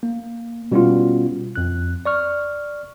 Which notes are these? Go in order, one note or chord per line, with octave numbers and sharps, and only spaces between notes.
A#3
B2 G3 B3 C#4 E4 F4
F2 F#6
D5 C#6 F6